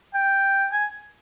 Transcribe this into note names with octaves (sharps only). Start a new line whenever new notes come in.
G5
G#5